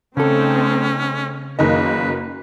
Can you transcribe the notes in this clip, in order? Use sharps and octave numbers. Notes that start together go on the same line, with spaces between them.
C#3 A3 C4 C#4 D#4 A4
F#1 D#3 A#3 F#4 B4 D#5